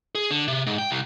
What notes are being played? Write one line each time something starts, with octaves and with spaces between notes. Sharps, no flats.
G#4
D3
C3
G#2
G5
C2